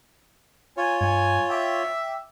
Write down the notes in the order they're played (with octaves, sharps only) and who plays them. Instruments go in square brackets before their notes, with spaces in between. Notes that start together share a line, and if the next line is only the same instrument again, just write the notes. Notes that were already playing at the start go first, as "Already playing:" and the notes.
[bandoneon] F4 C#5 [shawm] G#5
[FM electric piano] G2 [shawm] G#5
[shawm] E5 [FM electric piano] G5 D6